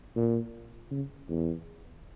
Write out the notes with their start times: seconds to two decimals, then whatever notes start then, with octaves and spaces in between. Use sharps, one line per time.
0.16 A#2
0.91 C#3
1.29 E2